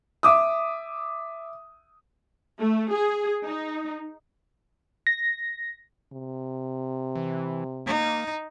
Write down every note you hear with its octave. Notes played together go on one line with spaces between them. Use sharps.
E5 D6 D#6
A3
G#4
D#4
A#6
C3
E3
A#3 D#4